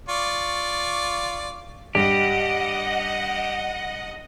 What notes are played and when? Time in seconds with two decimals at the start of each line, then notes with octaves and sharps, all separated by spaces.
0.09 F4 D5 C#6
1.95 G2 G3 G4 D#5 F#5